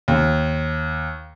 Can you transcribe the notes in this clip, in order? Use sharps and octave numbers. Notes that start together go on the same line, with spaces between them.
D#2